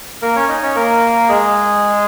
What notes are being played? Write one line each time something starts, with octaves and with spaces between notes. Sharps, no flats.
A#3 A#4
C#4 C#5
D#4 D#5
C#4 C#5
A#3 A#4
G#3 G#4